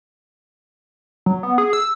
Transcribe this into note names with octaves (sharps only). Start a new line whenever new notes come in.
F#3
B3
G#4
E6